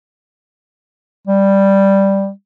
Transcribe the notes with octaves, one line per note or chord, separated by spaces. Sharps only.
G3